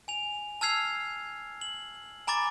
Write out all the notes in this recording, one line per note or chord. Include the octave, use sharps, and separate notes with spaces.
G#5 F7
A5 E6 F6 G#6 C7 F7
F#7
G#5 A#5 B5 D6 A6